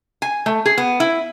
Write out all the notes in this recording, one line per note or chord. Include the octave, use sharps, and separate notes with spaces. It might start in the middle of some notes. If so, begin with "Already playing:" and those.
G#5
A3
G#4
B3
E4